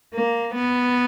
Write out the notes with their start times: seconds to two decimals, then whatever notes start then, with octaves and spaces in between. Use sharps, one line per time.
0.14 A#3
0.55 B3